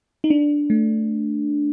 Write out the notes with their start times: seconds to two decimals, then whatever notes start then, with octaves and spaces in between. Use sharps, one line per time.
0.24 D#4
0.30 D4
0.70 A3